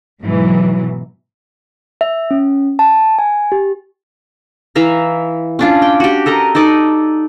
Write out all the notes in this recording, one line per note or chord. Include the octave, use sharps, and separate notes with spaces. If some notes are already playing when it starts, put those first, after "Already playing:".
G#2 B2 E3 F#3
E5
C#4
A5
G#5
G4
E3 E5 F5 A#5
C#4 D4 F4
G5
F#4 G4
A4 A#4 D#5 A#5
D#4 A4 D5 D#5